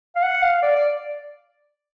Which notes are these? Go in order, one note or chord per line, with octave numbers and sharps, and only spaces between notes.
F5
F#5
F5
D5
D5